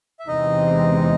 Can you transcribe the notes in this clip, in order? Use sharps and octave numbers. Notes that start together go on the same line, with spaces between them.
E5
E2 C3 E3 G#3 C4 D#4 D#5